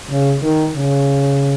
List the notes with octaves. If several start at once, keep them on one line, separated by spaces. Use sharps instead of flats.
C#3
D#3
C#3